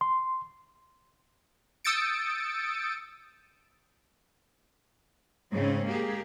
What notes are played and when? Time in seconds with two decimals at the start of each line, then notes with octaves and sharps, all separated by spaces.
0.01 C6
1.84 D#6 E6 G6 A6 C#7 D7
5.52 G#2 C#3 C4 C#4
5.88 G#3 A#3 G4 G#4